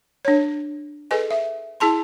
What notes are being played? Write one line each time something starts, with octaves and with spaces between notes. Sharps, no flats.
D4 C#5
G#4 A4 B4 D#5 G#5
E5
E4 G#4 A5 C6